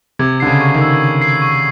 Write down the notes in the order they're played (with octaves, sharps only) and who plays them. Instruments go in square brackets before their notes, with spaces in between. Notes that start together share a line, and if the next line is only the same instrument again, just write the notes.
[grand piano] C3 [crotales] G#6
[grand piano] D3 [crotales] C7
[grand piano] C#3
[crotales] C#6
[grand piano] D#3
[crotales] E6
G#6
C7
C#6